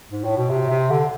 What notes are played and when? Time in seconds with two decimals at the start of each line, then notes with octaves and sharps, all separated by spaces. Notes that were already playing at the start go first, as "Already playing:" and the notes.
0.11 G#2
0.24 A2
0.38 B2
0.49 C3
0.70 C3
0.90 D3